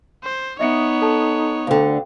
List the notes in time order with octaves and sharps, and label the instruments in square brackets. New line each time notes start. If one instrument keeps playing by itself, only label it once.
[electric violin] C5
[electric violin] B3 C#5 [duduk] D#4 [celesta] D#5 E5 C#7
[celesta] A4 A5
[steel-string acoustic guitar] D2 D3 [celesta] F5 G5